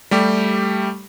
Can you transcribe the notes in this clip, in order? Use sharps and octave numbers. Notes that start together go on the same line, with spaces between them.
G3 A3 G4